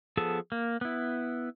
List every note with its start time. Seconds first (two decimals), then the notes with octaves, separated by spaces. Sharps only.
0.17 F3 B3 G#4 A4 A5
0.52 A#3
0.81 B3 E4